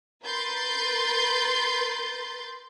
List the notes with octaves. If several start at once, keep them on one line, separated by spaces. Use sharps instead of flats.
A#4 B4 C6 G6 A6